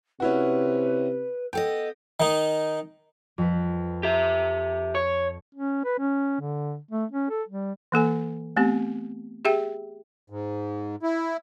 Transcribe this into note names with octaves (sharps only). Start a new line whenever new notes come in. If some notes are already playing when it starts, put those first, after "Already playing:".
C3 C#4 E4 F#4 B4
B3 A4 D#5 G5
D#3 D#4
F2 B4
G4 E5
C#5
C#4
B4
C#4
D3
A3
C#4
A4
G3
E3 A#3 A4 G#5
A3 B3 C4 G4
G4 G#4 E5 G5
G#2
E4